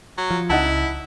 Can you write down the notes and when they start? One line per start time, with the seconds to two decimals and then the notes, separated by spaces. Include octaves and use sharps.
0.18 F#3
0.30 F3
0.50 C#2 D#4 E4 F#5 A5